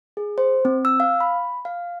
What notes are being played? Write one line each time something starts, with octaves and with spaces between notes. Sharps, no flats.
G#4
C5
C4
E6
F5
B5
F5